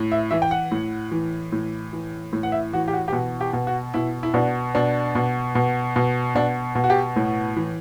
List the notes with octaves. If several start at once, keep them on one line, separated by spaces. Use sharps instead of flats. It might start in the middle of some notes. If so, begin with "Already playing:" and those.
Already playing: A2
E5
E3 E5
G5
F#5
A2
E3
A2
E3
A2
F#5
E5
E3 F#4
G4
F#4
G4
B2 F#4
G4
B2
F#4
B2 E4
E4
B2 D4
B2 D4
B2
B2
B2
B2 D4
B2
F#4
G4
A2
E3